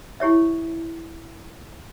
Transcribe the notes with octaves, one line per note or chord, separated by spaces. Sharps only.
E4 G4 C#5 E5